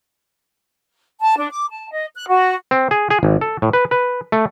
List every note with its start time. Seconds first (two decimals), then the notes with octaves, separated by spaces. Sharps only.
1.21 A5
1.38 D4
1.51 D6
1.70 A5
1.91 D#5
2.15 F#6
2.29 F#4
2.71 C4
2.91 G#4
3.10 G#4
3.23 G#1
3.41 A4
3.62 A2
3.73 B4
3.91 B4
4.32 A3